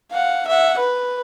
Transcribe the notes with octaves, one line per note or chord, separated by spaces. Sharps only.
F5 F#5
E5 F#5
B4